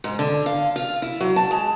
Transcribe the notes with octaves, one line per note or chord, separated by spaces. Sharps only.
G#2
D3
F5
F4
E4
F#3
A5
G#3